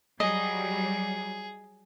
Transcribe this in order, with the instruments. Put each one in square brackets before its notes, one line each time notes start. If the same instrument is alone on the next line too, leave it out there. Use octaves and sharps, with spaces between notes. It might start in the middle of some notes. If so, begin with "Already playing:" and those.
[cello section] F#3 G3 [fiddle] G#4 [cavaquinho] D#5